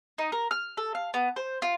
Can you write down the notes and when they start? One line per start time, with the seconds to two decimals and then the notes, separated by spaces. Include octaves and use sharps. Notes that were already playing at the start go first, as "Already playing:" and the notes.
0.18 D#4
0.32 A#4
0.51 F6
0.77 A4
0.95 F5
1.14 B3
1.36 C5
1.62 F4